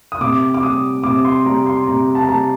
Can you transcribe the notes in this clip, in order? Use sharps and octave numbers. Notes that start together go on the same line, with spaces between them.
D#6
C3 D6
D6
G3 D#6
C3 D6
C6
G3 A#5
C6
C3 A#5
A5
A#5
G3 A5